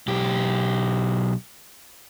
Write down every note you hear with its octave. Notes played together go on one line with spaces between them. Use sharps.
B1 G4